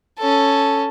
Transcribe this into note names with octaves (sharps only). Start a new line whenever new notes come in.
C#4 A4